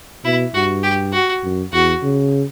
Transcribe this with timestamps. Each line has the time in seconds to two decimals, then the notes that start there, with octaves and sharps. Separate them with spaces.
0.24 B2 E4
0.54 G2 F#4
0.83 G4
1.13 F#4
1.43 F#2
1.73 E2 F#4
2.03 C#3